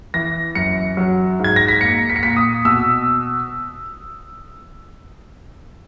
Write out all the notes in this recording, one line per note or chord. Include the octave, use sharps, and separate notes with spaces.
E3 A#6
F#2 C#7
F#3
G#2
G#6
A#6
B6
A#3 C#7
B6
C#7
A#2 B6
D#6
B2 E6